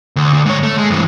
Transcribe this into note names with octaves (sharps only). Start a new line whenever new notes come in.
D2
D2
G#2 C#5
A3
G#3
G2 E3